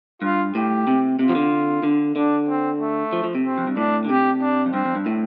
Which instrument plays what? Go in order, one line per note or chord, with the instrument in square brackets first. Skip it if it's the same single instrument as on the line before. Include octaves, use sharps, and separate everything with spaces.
[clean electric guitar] G2 [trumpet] F4
[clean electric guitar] A2 [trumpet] G4
[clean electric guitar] C3
[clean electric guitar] C3 [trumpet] F4
[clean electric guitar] F3
D3
D3
[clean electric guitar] D3 [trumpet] D4
[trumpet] C4
A3
[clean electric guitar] F3
F3
C3
[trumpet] C4
[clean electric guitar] F2
G2
[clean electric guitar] A2 [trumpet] D4
[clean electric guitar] D3
[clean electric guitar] C3 [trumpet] G4
[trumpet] D4
[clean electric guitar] F2
[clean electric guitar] G2 [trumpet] C4
[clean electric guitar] F2
G2
A2